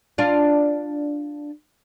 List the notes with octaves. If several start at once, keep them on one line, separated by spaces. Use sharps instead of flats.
D4 F4